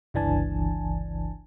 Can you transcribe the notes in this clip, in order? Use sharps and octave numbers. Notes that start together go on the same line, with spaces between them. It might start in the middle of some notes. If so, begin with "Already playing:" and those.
G1 C#2 E3 D4 G#5 A5